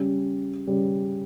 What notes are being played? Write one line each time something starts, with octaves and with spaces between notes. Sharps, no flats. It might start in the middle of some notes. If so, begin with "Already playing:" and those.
Already playing: C#3 G3 C#4
C#3 G3 C#4